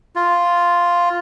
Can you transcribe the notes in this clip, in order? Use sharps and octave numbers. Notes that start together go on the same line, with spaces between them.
F4